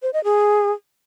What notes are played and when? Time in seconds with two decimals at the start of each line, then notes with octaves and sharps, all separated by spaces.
0.02 C5
0.13 D#5
0.24 G#4